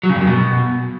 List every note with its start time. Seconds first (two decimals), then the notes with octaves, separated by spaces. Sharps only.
0.03 F#3
0.09 C#3
0.15 G2
0.21 F#2
0.27 B2